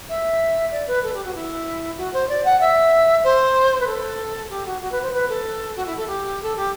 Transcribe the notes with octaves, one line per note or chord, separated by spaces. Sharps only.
E5
D5
B4
A4
G4
F#4
E4
F#4
C5
D5
F#5
E5
C5
B4
A4
G4
F#4
F#4
B4
C5
B4
A4
F#4
E4
A4
G4
A4
G4